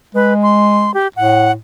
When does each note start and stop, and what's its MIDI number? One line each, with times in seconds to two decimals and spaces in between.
0.15 0.92 56
0.15 0.34 71
0.43 0.94 84
0.94 1.08 67
1.16 1.55 45
1.16 1.52 78